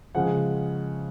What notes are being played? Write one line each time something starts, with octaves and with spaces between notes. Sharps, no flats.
C#3 F3 G#3 F#5